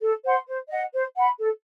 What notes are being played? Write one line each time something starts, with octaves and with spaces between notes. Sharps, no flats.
A4
C5 F#5 C6
C5
D#5 F#5
C5
F#5 B5
A4